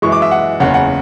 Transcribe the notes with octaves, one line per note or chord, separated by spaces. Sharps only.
F#2 E3 G#3 C#6
D6
E5
F#5
F#1 E2 C#3 F#5
F#5